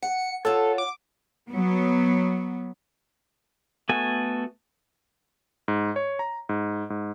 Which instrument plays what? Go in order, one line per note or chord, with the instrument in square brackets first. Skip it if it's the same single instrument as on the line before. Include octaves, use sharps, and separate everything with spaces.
[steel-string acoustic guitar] F#5 [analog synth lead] C#7
[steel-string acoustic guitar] F4 C#5 F#5 [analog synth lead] A4
[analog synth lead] D6
[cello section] F#3 B3
[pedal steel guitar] A3 B3 F#4 A4 G#5
[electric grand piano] G#2
C#5
A#5
G#2
G#2